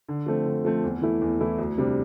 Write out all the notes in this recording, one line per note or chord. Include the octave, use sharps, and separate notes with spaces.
D3
F3 A3 C4
D3
F3 A3 C4
E2
E3 A3 E4
E2
E3 A3 E4
D2
C3 G3 D4